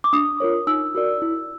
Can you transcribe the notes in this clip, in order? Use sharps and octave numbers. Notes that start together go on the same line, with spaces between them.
D6
D4 D#6
F4 A#4 C#5
D#4 E6
F#4 A#4 D5
E4